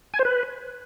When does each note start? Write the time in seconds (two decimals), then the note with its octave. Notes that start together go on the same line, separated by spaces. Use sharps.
0.14 G#5
0.19 C5
0.25 B4